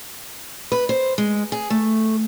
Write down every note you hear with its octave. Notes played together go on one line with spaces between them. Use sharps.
B4
C5
G#3
G#4
A3